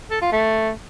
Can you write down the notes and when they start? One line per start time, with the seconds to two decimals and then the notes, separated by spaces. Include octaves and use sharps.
0.11 A4
0.21 F4
0.32 A3